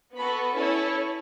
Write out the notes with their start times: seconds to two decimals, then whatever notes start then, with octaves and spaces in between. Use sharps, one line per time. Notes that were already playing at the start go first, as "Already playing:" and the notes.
0.17 B3 F#4 A4 B5
0.55 C#4 E4 A4 C#5